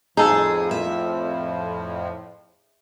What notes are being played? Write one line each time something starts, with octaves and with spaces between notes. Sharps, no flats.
F2 A2 F3 D#4 G#4 A4
E5